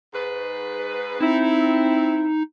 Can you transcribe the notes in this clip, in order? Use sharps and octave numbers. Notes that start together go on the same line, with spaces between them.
G#2 B4
C4 D#4 E4